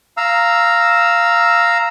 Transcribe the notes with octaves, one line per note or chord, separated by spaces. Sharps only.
F5 A#5 E6